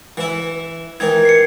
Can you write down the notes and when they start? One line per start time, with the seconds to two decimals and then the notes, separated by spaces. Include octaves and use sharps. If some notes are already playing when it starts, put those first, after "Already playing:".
0.17 E3 E4
1.00 D#3 E3 D#4 G#6
1.25 C7 C#7